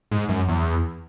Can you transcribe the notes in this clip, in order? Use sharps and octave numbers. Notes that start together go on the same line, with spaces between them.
G#2
F#2
E2